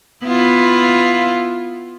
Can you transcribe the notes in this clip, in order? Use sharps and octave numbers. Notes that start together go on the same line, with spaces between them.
B3 E4 F4